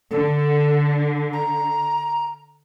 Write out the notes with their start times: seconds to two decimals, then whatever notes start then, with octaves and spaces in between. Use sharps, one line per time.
0.11 D3 A4
1.33 A#5